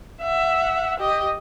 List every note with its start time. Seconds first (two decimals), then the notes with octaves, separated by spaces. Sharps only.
0.22 E5 F#5
0.99 G4 D#5